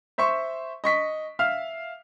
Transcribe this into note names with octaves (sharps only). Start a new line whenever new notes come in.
C5 E5 C6 C#6
D#5 C#6 B6
E5 F5 F6